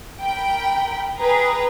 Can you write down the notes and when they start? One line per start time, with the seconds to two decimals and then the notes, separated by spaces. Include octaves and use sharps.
0.20 A#4 G5 B5
1.18 G#4 B4 G5 A#5